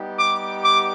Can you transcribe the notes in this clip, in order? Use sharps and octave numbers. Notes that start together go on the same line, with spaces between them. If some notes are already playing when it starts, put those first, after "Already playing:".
Already playing: G3 B3 D#4 G4
D6
D6